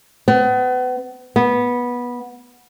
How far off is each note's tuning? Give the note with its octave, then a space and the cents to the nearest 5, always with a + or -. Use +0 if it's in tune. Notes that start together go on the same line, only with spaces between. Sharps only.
B3 +35
B3 -15